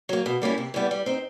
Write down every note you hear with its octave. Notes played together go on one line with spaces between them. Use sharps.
F#3 A#3
B2
G3 A#3 C#4 E4
C3
E3 G3 B3
G3
C4 D#4